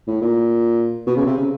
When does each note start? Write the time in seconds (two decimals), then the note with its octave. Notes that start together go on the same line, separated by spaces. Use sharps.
0.07 A2
0.21 A#2
1.06 B2
1.17 C#3
1.26 C3
1.37 C#3